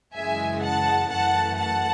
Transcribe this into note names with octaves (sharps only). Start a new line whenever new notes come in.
F#2 C#3 E3 G#3 E5 G#5
F#5 A5
F#2 E3 A3 F#5 A5
F#5 A5